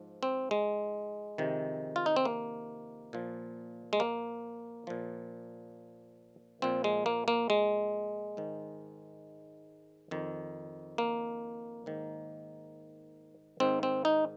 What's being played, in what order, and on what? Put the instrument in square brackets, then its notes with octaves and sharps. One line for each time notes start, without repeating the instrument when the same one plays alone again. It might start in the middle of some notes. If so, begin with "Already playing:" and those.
Already playing: [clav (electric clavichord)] G#2 F3
C4
G#3
F2 C3 D#3
F4
D#4
C4
A#3
A#2 F3
G#3
A#3
A#2 F3
A#2 F3 C4
G#3
A#3
A#3
G#3
G#2 D#3
F2 D#3
A#3
G#2 D#3
G#2 D#3 C4
C4
D#4